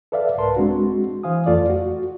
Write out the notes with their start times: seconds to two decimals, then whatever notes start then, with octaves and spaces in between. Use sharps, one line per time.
0.12 A4 B4 D5 E5 F5
0.38 C2 G#2 A#4 B4 A5 C6
0.56 G#3 C4 D4 F#4
1.23 E3 C5 F5 G#5 D#6
1.46 F2 A3 F4 A4 D5
1.70 F#4